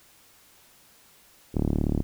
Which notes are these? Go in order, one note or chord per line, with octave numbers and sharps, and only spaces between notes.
D1